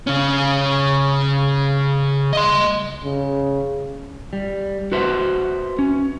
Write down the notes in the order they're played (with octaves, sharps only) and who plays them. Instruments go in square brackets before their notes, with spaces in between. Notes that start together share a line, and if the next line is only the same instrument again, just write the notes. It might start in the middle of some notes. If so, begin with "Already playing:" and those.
[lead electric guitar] C#3 C#4
D#5 C6
[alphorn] C#3
[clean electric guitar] G3
F#4 B4 C5 E5 F#5
C#4